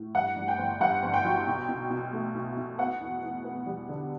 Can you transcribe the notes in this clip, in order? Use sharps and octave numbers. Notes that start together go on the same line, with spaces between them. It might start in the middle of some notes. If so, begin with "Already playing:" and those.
Already playing: A2
G2 F#5
G2
G5
G1
G2 F#5
G1
G5
F#3
B1
B2
B2
A3
B1
B1
B3 F#5
E2
E2
B3
G3
D3